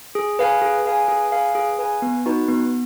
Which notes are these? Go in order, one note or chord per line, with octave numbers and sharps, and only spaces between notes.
G#4
B4 F5 G#5
G#4
B4 F5 G#5
G#4
B4 F5 G#5
G#4
B4 F5 G#5
B3
D#4 F#4 B4
B3